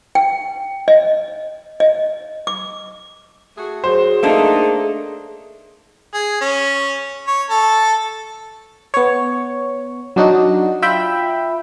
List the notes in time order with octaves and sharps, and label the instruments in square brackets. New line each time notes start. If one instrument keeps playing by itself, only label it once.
[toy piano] G5
D#5
D#5
D6
[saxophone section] A3 F#4 G#4
[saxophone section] F#3 [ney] G#4 [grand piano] C5
[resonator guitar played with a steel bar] A3 A#3 D4 [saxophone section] D#4
[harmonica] G#4
C#4
C#5
A4
[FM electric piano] B3 C#5
F#3 D4 D#4 F#4
F4 E5 G5 B5